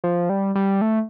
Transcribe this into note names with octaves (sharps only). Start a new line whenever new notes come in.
F3
G3
G3
A3